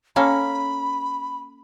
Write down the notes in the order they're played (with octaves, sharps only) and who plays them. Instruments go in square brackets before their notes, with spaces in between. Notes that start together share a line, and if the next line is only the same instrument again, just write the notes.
[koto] A#3 C#4 A4 [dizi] B5